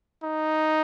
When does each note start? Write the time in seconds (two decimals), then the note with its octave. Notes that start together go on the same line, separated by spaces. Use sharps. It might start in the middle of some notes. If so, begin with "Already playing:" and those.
0.23 D#4